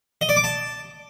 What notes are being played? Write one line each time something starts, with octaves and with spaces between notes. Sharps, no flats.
D#5
D5
D6
A5